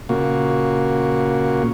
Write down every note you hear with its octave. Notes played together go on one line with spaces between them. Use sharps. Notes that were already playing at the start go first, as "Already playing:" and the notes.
A#2 C#3 A#3 F#4